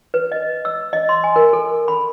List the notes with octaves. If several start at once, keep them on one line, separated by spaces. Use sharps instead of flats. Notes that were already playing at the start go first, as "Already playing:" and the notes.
B4
D#5
E6
D#5
C6
G#5
A#4
A4
B5